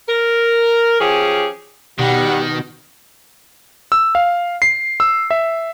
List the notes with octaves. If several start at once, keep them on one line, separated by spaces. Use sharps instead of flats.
A#4
F3 C#4 G4 G#4
B2 D#3 G3 G4 F#5
E6
F5
C7
E6
E5